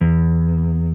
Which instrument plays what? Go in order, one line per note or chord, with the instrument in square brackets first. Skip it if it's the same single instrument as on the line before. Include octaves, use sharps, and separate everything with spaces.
[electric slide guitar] E2